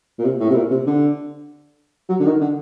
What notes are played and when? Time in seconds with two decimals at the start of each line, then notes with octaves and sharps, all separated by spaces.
0.19 A#2
0.25 C3
0.40 A2
0.50 C3
0.55 A#2
0.71 C3
0.87 D3
2.09 F#3
2.20 D3
2.26 D#3
2.41 D3